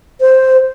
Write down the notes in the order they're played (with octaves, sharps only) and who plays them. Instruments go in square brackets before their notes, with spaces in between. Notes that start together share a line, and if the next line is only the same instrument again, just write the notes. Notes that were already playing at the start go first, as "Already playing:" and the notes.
[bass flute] C5